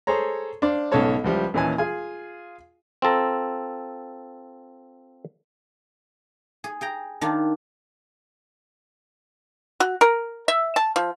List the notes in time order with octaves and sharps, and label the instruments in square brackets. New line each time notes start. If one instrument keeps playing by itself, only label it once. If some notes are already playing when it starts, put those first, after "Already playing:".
[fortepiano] G#4 A4 C5 C#5 A#5
D4 C5 D5 F5
B1 G#2 C#3 A4 C#5 A5
C#2 F3 G3 E4
D#2 A#2 E3 C#4 G#5 A5
F4 G#4 G#5
[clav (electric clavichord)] C4 F4 A4 A#5
[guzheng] G#4
G#4 G5 A#5
D#3 D4 F4
[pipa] F#4
A#4
E5
A5
F3